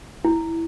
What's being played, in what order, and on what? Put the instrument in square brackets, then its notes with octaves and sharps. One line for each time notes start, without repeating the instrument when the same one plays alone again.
[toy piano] E4